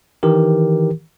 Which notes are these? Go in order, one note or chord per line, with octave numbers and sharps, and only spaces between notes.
D#3 E3 G4 A#4